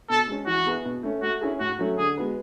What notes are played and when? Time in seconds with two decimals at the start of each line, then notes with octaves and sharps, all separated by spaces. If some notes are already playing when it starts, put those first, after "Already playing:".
0.10 B2 A4
0.27 G#3 C#4
0.46 E3 F#4
0.66 B3 E4 G#4 B4
0.85 B2
1.03 A3 C#4
1.22 A3 F#4
1.41 C#4 E4 G#4
1.59 A2 F#4
1.79 F#3 A3 C#4
1.98 D3 G#4
2.17 G#3 B3 F#4 B4